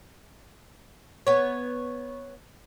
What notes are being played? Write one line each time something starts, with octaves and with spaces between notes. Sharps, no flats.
B3 C#5